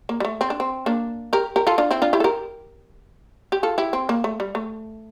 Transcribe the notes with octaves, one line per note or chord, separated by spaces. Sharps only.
A#3
G3
A3
C4
D4
C4
A#3 D4
G4 A#4
G4 A#4
F4 A4
D4 F4
C4 E4
D4 F4
E4 G4
A4
G4 A#4
G4
F4 A4
E4 G4
C4
A#3
A3
G3
A3